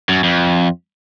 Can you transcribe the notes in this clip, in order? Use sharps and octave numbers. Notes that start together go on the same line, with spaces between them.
F#2
F2